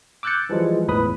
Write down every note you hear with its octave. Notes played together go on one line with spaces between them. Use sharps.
D6 E6 F#6 G6 A6 C#7
E3 F3 G3 G#3
G1 E2 A2 B4 B5 D#6